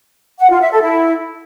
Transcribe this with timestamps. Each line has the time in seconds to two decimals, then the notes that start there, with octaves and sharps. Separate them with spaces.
0.39 F#5
0.50 F4
0.60 E5
0.71 A4
0.82 E4